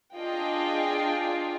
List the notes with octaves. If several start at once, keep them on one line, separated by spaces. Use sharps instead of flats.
D4 F4 G#4 D#5 G5